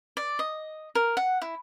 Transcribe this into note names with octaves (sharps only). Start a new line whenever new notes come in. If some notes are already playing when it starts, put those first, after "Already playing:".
D5
D#5
A#4
F#5
E4